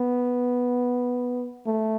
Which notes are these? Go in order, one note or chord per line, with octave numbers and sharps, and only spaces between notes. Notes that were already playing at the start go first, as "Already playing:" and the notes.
Already playing: B3
A3